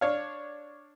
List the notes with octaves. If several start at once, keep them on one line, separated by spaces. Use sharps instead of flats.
D4 C#5 F5